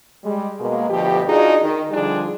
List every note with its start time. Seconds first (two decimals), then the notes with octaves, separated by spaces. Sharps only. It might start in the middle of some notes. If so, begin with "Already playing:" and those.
0.24 G3 G#3
0.58 B2 G#3 A#3
0.89 D2 B2 F3 G4
1.27 D4 D#4 F4 F#4 G#4
1.61 D#3
1.90 D3 F3 G3 D4 D#4 G#4